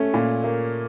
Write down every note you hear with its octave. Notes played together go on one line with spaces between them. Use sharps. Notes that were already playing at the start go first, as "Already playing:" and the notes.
Already playing: A3 C#4
A#2
A#3